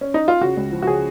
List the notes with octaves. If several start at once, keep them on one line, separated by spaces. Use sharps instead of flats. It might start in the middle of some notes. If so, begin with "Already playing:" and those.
C#4
D#4
F4
C#3 F#4
C#2
F3
F#4
C#3 G#4